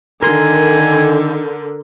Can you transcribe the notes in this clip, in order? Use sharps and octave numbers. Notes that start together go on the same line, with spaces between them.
D3 D#3 A#4 G#5 C6